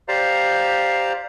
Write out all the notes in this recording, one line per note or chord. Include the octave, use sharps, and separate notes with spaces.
G4 C5 D5 F5 A#5